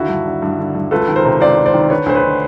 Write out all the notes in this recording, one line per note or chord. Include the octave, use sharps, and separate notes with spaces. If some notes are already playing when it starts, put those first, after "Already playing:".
Already playing: D#2 D3 E4 F#4
G2
D3
G2
D3
G2
C#2 A4 B4
D#3
A#4 C5
C3
C#2 C5 D5
C#2
C5 D5
D#3
D3 B4 C#5
D2 C5
B4 C#5
D3